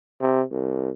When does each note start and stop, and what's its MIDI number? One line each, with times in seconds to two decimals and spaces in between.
0.21 0.42 48
0.52 0.90 36